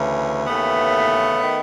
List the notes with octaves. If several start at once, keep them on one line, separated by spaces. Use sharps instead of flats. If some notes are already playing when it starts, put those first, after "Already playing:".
Already playing: D2 C#3 E3
D#2 C#3 E3 A3 B3
D#3